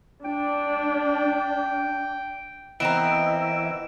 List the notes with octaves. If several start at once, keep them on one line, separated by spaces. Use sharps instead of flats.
D4 G5
E3 B3 C4 E4 A#4 D#5 D7 E7